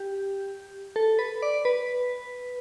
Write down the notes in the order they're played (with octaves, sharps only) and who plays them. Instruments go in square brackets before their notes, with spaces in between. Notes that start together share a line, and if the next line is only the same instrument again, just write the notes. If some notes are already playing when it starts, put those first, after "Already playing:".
Already playing: [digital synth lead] G4
A4
B4
D5
B4